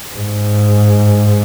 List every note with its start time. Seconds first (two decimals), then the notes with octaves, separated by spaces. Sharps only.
0.14 G#2